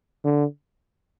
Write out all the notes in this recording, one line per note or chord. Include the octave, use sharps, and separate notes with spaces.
D3